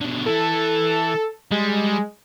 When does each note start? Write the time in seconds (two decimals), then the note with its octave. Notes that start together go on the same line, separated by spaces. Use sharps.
0.01 B2 D3
0.26 E3 A4
1.52 G3 G#3